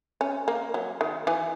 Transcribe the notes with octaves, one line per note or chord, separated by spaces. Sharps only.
C#4
A#3
F#3
D#3
E3